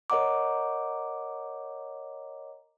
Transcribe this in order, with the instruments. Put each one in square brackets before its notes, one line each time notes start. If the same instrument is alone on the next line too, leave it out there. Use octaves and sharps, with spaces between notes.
[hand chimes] A#4 C#5 D#5 F#5 A#5 D6